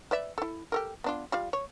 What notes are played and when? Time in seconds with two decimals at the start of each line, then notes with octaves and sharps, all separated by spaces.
0.11 B4 D5 E5
0.38 E4 A4
0.72 G4 A4 A#4
1.04 B3 D4 F4
1.32 G3 F4 F5
1.53 C#5